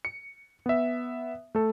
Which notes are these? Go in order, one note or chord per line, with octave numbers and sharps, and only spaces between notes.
C#7
B3 E5
A3 A4